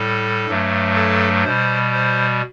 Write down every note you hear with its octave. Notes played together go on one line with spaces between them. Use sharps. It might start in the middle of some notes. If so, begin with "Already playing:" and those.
Already playing: A2 G3 A4
G2 F#3 A3
A4
B2 G3 C5
C5